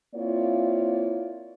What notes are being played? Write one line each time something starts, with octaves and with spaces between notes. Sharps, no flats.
A#3 C4 E4 F4 C#5 D5